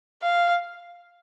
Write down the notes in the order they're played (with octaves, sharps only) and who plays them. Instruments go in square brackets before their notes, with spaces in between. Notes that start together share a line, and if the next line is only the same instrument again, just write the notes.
[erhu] F5